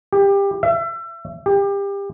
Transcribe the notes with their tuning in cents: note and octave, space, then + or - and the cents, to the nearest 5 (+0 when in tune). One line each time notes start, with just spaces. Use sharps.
G4 +20
E5 +30
G4 +25